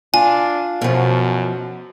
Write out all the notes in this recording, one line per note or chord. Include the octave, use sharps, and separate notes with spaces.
D4 F4 G#5
F#2 B2 F3